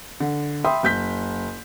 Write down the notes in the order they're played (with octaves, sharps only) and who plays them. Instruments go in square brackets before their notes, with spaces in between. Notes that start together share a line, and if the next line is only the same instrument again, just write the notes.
[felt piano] D3
E5 G5 B5 C6 D#6
F#1 G6 B6